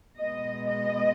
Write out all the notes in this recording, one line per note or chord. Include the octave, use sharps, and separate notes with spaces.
B2 G#3 B3 D#5
D#5